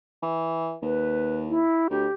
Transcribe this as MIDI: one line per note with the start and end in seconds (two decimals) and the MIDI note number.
0.23 0.75 52
0.82 1.62 39
0.82 1.37 71
1.48 1.88 64
1.90 2.07 38
1.90 2.14 67